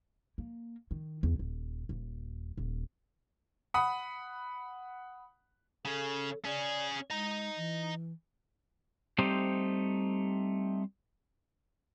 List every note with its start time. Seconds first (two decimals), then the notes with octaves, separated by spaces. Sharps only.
0.38 A#3
0.91 D#3
1.23 E2
1.39 D#1
1.89 D#1
2.58 D#1
3.74 F#5 B5 D#6
5.85 C#3 C#4 A4
6.45 C#4 G#4 D5
7.10 G#3 D#5 A#5
7.57 E3
9.18 G3 A3 C4 D#4 G4 C5